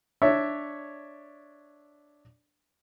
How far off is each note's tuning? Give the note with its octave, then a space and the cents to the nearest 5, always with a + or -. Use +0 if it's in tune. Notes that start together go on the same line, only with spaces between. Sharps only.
D4 +0 C#5 +0 E5 +0